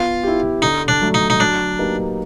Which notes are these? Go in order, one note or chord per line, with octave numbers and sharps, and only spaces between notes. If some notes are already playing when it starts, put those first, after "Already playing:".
Already playing: B3 F4
E4 G4
D3 D#4
D4
F#3 A3
D#4
D#4
F#3 D4
A#3 D#4 G4 B4